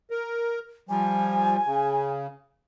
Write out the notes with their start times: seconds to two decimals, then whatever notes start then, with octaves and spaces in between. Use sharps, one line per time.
0.11 A#4
0.89 F3 G3 G#5
1.66 C#3